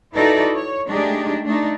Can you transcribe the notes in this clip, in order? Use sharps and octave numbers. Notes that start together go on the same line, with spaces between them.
D#4 E4 F#4 A4 B4 D5
C#5
G#3 A3 D4 D#4 G4 G#4
A3 D4 D#4